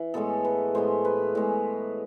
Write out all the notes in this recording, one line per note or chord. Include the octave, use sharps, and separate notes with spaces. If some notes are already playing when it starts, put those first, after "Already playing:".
Already playing: E3
A2 G#3 B3 A4
B4
A2 G#3 B3 C5
B4
A2 G#3 B3